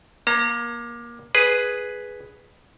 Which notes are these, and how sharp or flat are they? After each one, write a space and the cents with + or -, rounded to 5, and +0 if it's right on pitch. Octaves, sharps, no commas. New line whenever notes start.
A#3 +25 A#5 -35
G#4 +0 B4 +0